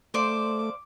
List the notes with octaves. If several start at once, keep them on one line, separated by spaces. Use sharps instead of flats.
A3 C5 D5 F5 D6